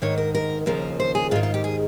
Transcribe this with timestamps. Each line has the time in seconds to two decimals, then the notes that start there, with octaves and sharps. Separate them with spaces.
0.02 G#2 D#3 C#5
0.18 A#4
0.35 A#4
0.66 D#2 C#3 F3 A#4
1.00 C5
1.15 G#4
1.31 G#2 F4
1.36 D#3
1.43 F4
1.54 G4
1.64 G#4